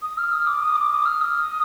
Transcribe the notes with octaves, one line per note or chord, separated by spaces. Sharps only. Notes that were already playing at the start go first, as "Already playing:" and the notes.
D#6
F6
D#6
D6
D#6
D6
D#6
F6
D#6